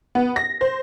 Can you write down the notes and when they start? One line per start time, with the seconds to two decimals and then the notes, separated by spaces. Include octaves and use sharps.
0.15 B3
0.36 A#6
0.61 C5